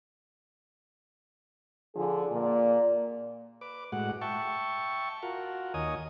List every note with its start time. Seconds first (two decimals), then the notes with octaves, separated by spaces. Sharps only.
1.96 D3 F3 D4 G#4
2.31 A#2 D5
3.61 B4 D6
3.92 A2 G#3 F#4 F#5
4.21 E5 G5 A5 C#6
5.23 F4 F#4 A#4
5.74 D#2 C#5 D#5 G#5 D#6